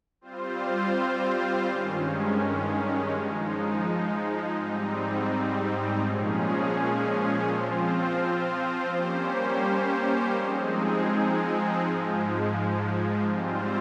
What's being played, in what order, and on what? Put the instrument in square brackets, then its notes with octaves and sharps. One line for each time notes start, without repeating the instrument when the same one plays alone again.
[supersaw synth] G3 C4 F4 C5
G2 D#3 G#3 C#4
F3 G#3 D#4
G#2 G3 C4 D#4
A#2 F3 G#3 C#4 G#4
F3 C4 F4 C5
G3 A#3 C#4 G4 C5
F3 G#3 C4 D#4 G#4
G#2 F3 G#3
G#2 G3 C4 F4 C5